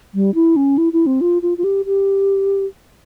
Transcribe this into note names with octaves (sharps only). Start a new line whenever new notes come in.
G3
E4
C#4
E4
E4
C4
F4
F4
F4
G4
G4